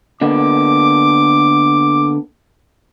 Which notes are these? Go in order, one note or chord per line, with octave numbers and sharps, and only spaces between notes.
D3 A#3 B3 D6